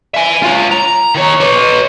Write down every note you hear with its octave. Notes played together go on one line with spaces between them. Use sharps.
E5 G#5
F4 C#5
A#5
D#3 C#5
B4 C#5